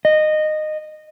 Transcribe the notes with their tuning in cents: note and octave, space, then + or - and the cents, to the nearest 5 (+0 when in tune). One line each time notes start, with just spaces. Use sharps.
D#5 -15